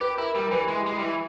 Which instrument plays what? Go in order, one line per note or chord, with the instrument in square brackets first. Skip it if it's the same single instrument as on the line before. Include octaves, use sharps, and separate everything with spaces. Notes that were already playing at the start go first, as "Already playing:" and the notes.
[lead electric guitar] G4 [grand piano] B4
[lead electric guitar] E4 [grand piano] A#4
[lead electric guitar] G3 [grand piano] G4
[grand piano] A#4
[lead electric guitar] E3 [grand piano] B4
[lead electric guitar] G#3 [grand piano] E4
[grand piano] G4
[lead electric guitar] G#3
[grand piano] E4
[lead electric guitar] G3
E3